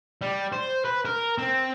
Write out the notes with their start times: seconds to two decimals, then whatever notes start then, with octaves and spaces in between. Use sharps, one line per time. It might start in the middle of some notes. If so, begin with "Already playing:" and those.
0.21 G3
0.53 C5
0.85 B4
1.05 A#4
1.38 C4